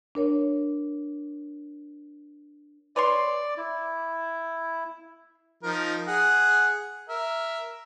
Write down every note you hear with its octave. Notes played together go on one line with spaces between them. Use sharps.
D4 A#4 C#5
B4 C#5 D5 C6
E4
F3 D#4 A#4
G#4 F#5
A#4 E5